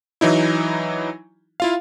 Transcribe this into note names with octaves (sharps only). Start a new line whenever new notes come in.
E3 F#3 D#4 E4
E4 F4 F5